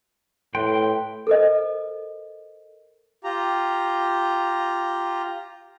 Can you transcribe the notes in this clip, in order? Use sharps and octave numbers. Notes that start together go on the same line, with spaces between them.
A2 B4 G5 C6
A4 A#4 C5 D#5
F4 G4 A#5